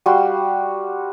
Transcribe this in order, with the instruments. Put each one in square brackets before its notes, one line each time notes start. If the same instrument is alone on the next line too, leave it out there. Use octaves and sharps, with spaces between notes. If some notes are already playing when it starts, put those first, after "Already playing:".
[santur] G3 F#4 F5 C6